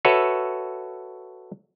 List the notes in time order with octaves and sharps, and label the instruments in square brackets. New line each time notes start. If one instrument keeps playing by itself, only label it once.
[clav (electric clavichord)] F#4 A4 B4 C#5 E5